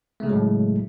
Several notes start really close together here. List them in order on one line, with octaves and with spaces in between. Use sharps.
A3 C#3 G#3 F#3 A2